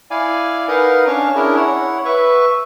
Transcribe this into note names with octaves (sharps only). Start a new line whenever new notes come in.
E4 D5 F5 G#5
D#4 A#4 B4 D#5 F5 F#5
C#4 D4 C#5 F5 C#6
C#4 D4 E4 G#4 A#4
E4 C#5 F#5
B4 E5 C#6